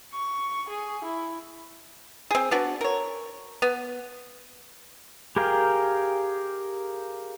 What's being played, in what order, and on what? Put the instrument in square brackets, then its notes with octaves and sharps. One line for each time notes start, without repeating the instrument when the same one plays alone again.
[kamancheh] C#6
G#4
E4
[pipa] C4 G#4
B3 D4 F#4
A#4 C#5
B3
[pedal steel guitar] G4 G#4 A#4 F5 G5